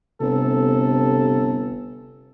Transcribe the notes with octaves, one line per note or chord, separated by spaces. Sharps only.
G1 C3 A4